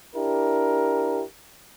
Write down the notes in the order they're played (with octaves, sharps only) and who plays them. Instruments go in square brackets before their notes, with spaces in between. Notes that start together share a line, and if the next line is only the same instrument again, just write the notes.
[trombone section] D4 E4 G4 A#4